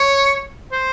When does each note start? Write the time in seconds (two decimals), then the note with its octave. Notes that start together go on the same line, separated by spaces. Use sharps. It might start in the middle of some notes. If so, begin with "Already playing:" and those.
Already playing: C#5
0.72 C5